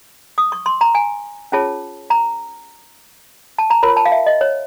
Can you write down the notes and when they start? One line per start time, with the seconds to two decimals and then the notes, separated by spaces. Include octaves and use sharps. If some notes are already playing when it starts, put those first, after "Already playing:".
0.38 D#6
0.52 C#6
0.66 C6
0.81 A#5
0.95 G#5
1.52 C#4 F4 G#4 C#5 A5
2.10 A#5
3.58 A5
3.70 A#5
3.83 F4 A#4 C#5 B5
3.97 A5
4.05 F5
4.12 E5
4.26 D#5
4.41 C#5